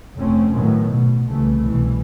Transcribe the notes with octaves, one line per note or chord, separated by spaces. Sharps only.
F1 F2 A3 C4 C#4
A2 D#3 F#3 A3 B3
B2
C2 C#3 E3 A3
C2 B2 E3